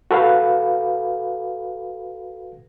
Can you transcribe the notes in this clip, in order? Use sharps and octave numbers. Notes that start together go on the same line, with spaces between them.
F#4 A4 B4 F5